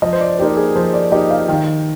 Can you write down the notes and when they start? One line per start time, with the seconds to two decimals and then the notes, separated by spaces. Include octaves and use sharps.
0.02 F3 D#5
0.13 C5
0.21 D5
0.39 A#3 D#4 G4 C5
0.57 G#4
0.75 F3 C5
0.94 D5
1.11 A#3 D#4 G4 D#5
1.31 F5
1.48 D#3 G5